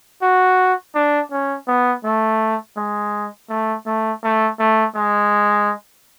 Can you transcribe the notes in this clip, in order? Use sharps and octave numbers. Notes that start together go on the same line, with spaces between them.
F#4
D4
C#4
B3
A3
G#3
A3
A3
A3
A3
G#3